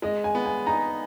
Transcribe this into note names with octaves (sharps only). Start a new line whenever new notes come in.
G#3 D#5
G#5
B3
G#5
D#4 A#5